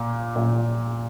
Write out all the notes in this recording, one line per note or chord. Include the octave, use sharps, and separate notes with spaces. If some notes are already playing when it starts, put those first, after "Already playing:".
Already playing: A#2
A#2